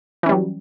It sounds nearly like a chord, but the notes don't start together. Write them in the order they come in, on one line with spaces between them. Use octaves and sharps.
E3 C#4 G3 F#3